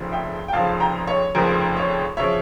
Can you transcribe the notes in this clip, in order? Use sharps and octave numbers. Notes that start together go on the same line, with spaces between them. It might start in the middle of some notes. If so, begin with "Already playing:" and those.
Already playing: F1 F2 C#3 F3
E5 G5
G5
F1 F2 C#3 F3 F5 A5
G5 A#5
C#5
F1 F2 C#3 F3 A#4
C#5
C#3 F3 C#5 E5